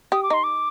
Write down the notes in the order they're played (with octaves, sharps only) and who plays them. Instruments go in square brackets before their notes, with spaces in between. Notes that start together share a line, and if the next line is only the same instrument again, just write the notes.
[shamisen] G4 [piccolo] D#6
[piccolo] D6
[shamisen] D#4 [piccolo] C6
[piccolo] D6